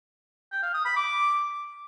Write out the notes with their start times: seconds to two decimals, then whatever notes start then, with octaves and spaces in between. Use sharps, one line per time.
0.51 G5
0.63 F5
0.74 D#6
0.85 B5
0.96 D6